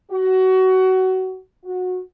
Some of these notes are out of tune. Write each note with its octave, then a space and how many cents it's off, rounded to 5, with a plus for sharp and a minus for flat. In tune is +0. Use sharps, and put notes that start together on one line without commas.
F#4 +20
F#4 -20